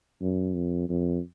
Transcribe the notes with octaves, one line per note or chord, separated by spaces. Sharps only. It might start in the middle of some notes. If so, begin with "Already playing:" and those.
F#2
F2
F2